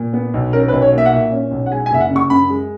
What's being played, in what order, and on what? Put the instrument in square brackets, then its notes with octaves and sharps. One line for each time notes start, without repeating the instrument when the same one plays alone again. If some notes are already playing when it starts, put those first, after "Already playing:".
Already playing: [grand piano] A#2
B3
B1
C#4 A#4
B4
B1
C#5
A#3
E5
F#5
A#2 E5
C#4
B1
F#5
G#3 G#5
G#5
F#1 E5
F#5
C#3
C#6
F#2 B5
G#3